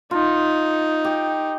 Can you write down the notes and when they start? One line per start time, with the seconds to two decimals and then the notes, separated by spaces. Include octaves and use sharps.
0.11 D#4 F4
1.04 G4